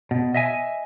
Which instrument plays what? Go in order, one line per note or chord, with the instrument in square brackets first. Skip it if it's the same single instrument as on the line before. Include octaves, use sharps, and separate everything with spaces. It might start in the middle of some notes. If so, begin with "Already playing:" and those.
[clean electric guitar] B2
D#5 E5 G#5